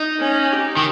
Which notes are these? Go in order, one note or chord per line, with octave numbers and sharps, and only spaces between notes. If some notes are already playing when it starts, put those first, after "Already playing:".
Already playing: D#4
C#4
G4
D#3